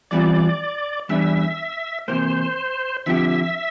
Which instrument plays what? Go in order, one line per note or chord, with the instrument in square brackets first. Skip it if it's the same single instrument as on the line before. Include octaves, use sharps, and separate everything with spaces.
[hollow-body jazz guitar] E2 E3 G3 C4 F4 [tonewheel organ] D5
[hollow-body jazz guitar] E2 E3 G3 D4 [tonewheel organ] E5
[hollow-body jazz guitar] C3 E3 A#3 [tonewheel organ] C5
[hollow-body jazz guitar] D3 F3 C4 G4 [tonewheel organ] E5